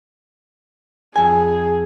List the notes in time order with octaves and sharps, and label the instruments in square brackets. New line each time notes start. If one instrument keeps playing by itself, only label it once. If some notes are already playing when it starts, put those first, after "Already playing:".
[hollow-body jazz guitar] F2 G#5 [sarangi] G#4